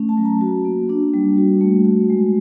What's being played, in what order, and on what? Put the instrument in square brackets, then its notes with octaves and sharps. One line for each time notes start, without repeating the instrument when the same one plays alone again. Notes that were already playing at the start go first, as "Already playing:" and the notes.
Already playing: [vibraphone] A3 C#4
A5
F#3
A#5
F#4
A#3
D4
G3
F#4
A3
F#4
G#3